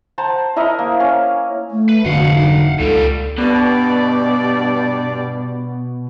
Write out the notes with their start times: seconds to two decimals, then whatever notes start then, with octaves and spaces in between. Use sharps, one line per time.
0.18 C5 F#5 A5 A#5
0.56 E4 A#4 D#5 E5
0.79 A#3
1.00 C#4
1.71 A3
1.89 B4
2.05 F1 D3 D4 F#4 F5 F#5
2.36 D#4
2.79 C#2 A#2 G3 A4
3.38 G2 B2 D5